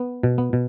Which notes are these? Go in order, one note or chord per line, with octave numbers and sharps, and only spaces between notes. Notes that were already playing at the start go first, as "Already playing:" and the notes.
Already playing: B3
B2
B3
B2